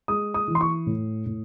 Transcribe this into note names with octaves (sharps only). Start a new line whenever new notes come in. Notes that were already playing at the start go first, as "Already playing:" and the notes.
G#3 D#6
D#6
E3
C6
C#6
A2
A2